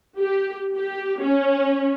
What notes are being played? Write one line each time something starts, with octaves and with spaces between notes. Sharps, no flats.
G4
G4
C#4